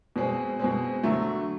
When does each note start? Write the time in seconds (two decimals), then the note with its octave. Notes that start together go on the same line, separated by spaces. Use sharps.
0.16 B2 G#3 C4
0.59 B2 G#3 C4
1.03 D3 F#3 A3